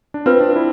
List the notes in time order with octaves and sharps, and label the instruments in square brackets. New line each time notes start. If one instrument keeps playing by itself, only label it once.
[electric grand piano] D4
[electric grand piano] C4 [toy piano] F4 B4 F5
[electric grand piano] D4
E4